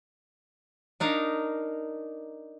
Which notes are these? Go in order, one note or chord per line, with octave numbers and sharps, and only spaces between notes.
D4 D#4 A#4 F5